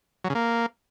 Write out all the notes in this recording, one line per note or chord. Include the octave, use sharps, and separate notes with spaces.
F#3
C#3
A#3